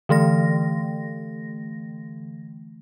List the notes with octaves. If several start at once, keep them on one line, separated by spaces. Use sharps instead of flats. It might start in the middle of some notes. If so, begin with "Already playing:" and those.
D3 E3 A3 A#6